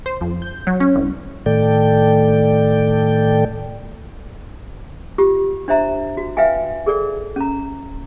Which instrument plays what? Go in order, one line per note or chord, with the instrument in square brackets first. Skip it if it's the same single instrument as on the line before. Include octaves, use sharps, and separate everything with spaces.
[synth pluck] C5
F2
G6
F#3
C#4
C2
[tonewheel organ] A2 D#3 A3 A4 D5 G5
[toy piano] F4 G4
D4 C5 E5 A#5
F#4
B4 E5 F5 G5 G#5
G#4 A4 D5
C#4 A#5